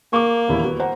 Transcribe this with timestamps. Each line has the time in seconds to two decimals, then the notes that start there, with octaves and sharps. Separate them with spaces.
0.13 A#3 C#6 D6
0.48 D#1 E2 E4
0.63 B3 F#4
0.80 C5 F#5 A#5